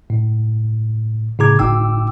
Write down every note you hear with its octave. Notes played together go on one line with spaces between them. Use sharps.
A2
A2 C#3 G#4 A#5 D6 G#6
G1 A2 D#4 G5 D6 E6